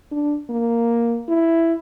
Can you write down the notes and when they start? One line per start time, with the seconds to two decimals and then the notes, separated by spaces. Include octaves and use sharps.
0.12 D4
0.50 A#3
1.28 E4